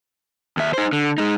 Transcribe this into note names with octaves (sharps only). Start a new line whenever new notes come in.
D#2 E5
D#4 C5
D3
G#3 D#4